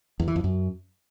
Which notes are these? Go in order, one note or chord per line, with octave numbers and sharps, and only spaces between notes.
E2
E3
F2
F#2